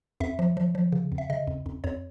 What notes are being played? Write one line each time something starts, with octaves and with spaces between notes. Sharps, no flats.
F2 E5
F3
F3
F3
C#3
F2
E5
C#3 D#5
F2
F2
F2 C#5